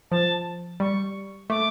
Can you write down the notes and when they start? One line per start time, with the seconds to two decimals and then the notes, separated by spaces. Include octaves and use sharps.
0.11 F3 A5
0.80 G3 C#6
1.50 A3 D6